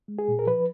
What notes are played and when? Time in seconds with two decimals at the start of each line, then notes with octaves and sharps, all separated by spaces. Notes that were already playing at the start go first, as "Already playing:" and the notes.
0.08 G#3
0.19 G#4
0.28 A#2
0.39 A#4
0.47 F3 B4